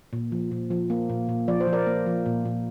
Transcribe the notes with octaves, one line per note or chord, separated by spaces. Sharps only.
A#2
F3
A#2
F3
A#3
A#2
A#2
F3 D5
C5
F3
A#4 D5
A#3
F3
A#2
A#2